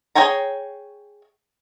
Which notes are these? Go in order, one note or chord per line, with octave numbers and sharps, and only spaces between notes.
G#4 C#5 G5 G#5 A#5